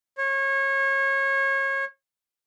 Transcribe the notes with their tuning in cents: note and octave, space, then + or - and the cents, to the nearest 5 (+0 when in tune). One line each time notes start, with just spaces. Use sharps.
C#5 -25